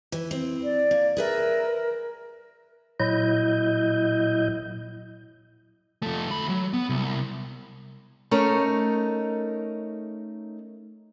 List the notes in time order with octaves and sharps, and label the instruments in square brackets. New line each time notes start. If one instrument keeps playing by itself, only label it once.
[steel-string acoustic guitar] E3
C4
[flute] D5
[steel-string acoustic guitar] A#3
[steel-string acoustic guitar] G#4 B4 E5 [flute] A#4
[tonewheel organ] A#2 F#3 E4 D#5 G6
[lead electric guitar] F2 A3
D2 B5
F#3
B3
C2
[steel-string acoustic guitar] A3 C#4 D#4 A#4